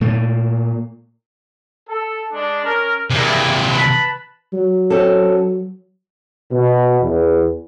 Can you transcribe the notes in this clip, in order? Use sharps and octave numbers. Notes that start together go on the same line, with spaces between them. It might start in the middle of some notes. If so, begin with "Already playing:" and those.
A#2 A3 A#3
A4
G#3 D4
C#4 A#4
C3 A#3 D4 E4 G#4
B4 A5 B5
F#3
C4 C#4 A4
B2
E2